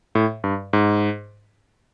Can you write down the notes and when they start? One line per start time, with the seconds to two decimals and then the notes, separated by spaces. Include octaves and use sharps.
0.15 A2
0.44 G2
0.73 G#2